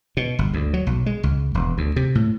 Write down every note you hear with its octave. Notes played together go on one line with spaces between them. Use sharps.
B2
G1
D2
F#3
B1
G#3
C#2
E1
D2
C3
A2